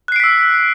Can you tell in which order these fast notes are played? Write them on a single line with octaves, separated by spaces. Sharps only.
F#6 C7 D7 B6 E6